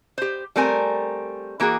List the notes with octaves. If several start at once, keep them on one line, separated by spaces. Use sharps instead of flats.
G4 C5
G3 A3 C4 A#4 G#5
E3 A#3 F#4 G#4